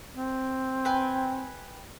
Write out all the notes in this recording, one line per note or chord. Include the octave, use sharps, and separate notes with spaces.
C4
B4 G5 G#5